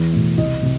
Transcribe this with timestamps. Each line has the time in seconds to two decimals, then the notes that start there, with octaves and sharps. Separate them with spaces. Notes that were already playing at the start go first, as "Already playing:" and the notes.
Already playing: E2
0.13 B2 A3
0.37 C2 D#5
0.63 C3